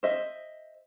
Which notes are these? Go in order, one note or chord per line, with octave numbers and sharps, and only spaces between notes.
C5 D#5 E5